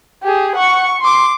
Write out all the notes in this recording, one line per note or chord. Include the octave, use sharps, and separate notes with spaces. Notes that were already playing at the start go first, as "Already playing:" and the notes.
G4 G#4
F#5 C#6
C6 D6